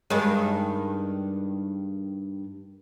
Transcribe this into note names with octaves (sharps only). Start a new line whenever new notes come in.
G2 D#3 G#3